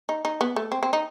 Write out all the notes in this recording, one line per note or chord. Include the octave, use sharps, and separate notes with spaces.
D#4
D#4
B3
A3
C4
C4
D#4